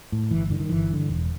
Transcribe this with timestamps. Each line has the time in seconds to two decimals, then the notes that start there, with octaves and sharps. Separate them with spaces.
0.12 A2
0.31 G1 E3
0.50 G2 D3
0.60 D#3
0.69 G1 E3
0.90 G2 D3
1.09 E1